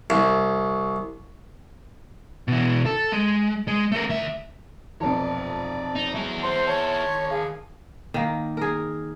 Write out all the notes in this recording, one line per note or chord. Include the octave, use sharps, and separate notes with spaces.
C2
B2 E3
A4
G#3
G#3
A3 A#4
D2 E5
F1 B1 F2 C#5 D5
D#4
F#3 E4 G#4
C5 C6
D#3 C#5 A5
G#4 F5
D#3 A#3
G#4 A#4